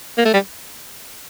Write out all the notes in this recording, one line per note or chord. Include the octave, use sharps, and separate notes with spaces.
A#3
A3
G3